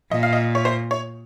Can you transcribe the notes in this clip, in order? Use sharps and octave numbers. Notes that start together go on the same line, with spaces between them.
A#2 D#5
F5
D#5
C#5
C5
C#5